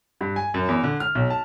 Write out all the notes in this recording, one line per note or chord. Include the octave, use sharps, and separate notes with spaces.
G2
G#5
F#2
E2
D3
F6
B1
A5